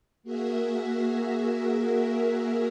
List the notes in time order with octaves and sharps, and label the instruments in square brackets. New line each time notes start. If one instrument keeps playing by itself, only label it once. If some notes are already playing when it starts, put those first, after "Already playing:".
[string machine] A#3 F#4 G#4 A#4 E5